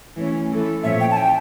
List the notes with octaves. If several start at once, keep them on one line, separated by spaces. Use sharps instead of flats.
E3 A3 C#4
E3 A3 C#4 E4 A4
A#2 F3 C#4 F4 C#5 E5
G5
A5
G5